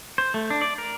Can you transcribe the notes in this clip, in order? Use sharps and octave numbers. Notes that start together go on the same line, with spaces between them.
C5
A3
D4
D5
A#4